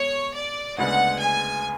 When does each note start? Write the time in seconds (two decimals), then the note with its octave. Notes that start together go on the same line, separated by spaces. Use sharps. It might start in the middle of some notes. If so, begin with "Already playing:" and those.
Already playing: B2 G#3 C#5
0.35 D5
0.78 D2 C#3 G#3 B3 D4 F#5
1.21 G#5